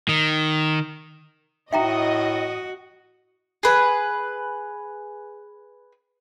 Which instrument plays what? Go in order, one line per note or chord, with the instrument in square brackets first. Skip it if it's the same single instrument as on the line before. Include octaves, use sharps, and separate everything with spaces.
[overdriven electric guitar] D#3
[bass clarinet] A2 [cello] F#4 [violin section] D#5 [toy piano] E5 G5 A#5
[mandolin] G#4 B4